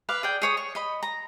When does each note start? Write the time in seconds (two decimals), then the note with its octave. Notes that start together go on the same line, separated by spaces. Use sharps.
0.09 B4 F5 D6
0.23 G#4 D5 G5
0.42 G#4 C#5 D#6
0.57 C#5
0.75 D#5 B5
1.03 A#5